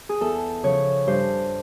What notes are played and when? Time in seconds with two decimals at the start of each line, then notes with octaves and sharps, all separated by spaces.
0.09 G#4
0.21 E2 A4
0.63 C#3 F3 C#5
1.07 G2 C5